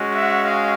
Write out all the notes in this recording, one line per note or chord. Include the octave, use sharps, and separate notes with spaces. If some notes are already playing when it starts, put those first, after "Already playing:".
Already playing: G#3 C#4 F#4
E5 F#5
D#5 F5